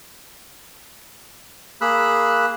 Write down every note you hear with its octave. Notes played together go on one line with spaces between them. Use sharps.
A#3 G#4 B5 E6 F#6